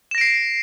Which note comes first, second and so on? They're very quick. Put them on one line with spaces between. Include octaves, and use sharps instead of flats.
E7 A#6 D7 C7